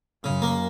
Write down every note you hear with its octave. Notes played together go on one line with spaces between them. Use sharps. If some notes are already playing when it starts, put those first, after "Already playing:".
F#2 C#3
A#3